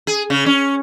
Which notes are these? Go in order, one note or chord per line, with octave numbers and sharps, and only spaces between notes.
G#4
C#3
C#4